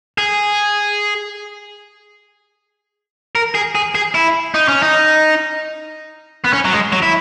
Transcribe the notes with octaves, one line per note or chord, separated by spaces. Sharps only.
G#4
A#4
G#4
G#4
G#4
E4
D#4
C#4
D#4
B3
C#4
F#3
G#3
F#3
E4